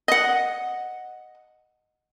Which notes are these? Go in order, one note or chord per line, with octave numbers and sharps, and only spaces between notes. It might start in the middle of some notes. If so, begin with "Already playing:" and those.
D#5 F#5